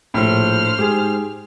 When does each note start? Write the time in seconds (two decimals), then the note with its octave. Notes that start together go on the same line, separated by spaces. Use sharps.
0.14 A#1 A2 C5 F6
0.79 G#2 G4 G#4